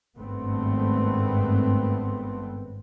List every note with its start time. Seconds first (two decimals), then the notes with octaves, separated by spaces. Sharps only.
0.18 G#1 G2 A3 B3 C4